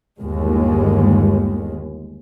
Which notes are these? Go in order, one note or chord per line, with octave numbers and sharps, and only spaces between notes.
G1 D#2 G#3